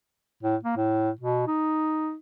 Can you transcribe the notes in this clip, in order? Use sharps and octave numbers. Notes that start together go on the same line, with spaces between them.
A2
A#3
A2
B2
D#4